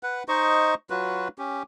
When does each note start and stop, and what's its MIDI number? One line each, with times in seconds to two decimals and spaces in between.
0.03 0.23 71
0.03 0.23 78
0.28 0.75 63
0.28 0.75 72
0.28 0.75 75
0.28 0.75 85
0.90 1.28 54
0.90 1.28 65
0.90 1.28 66
0.90 1.28 71
1.38 1.63 61
1.38 1.63 67